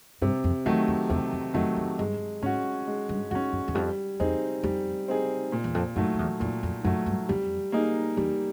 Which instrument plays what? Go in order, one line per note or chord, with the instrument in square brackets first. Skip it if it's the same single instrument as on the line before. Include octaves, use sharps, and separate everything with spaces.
[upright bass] G2 [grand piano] C3
[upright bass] F2
[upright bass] E2 [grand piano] D#3 F#3 A3
[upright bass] F2
[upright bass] E2 [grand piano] C3
[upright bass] F2
[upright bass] F2 [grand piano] D#3 F#3 A3
[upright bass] F2
[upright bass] G2 [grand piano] G#3
[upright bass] G#2 [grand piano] C#4 F#4
[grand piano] G#3
[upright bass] G2
[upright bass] F#2 [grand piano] F#4
[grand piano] C#4
[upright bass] F#2
E2
[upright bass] F2 [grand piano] G3
[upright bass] E2 [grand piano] C4 D#4 G#4
[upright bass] F2 [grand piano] G3
[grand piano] C4 D#4 G#4
A#2
[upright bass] E2
F2
[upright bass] F#2 [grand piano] F#3 A3
[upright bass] F2
E2
[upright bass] F2 [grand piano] A#2
[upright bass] F2
[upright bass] F#2 [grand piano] F#3 A3
[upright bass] G2
[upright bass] F2 [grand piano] G3
[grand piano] A#3 D#4 G#4
[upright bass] E2 [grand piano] G3